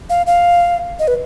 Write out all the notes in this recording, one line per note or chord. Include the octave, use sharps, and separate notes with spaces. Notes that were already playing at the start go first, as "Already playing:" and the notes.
F5
F5
D#5
B4